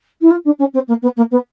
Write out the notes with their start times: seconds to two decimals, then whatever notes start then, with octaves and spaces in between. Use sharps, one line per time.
0.21 E4
0.30 F4
0.45 D4
0.59 C#4
0.73 C4
0.88 A#3
1.02 B3
1.16 A#3
1.31 B3